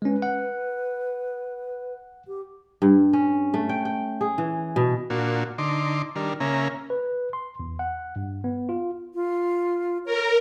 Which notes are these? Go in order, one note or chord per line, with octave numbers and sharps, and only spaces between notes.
G#3 C#4 B4
F#5
G4
G2
C#4
A3
G5
G5
G#4
E3
B2
A#2 A#3 D4 F#4
D3 D#4 C6 D6
D#3 G3 D4 A#4
C#3 A#3 C#4 E5 A#5
B4
C6
E2
F#5
G2
B3
F4
F4
A#4 C#5